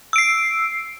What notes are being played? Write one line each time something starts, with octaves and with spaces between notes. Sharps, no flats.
E6 C7 D7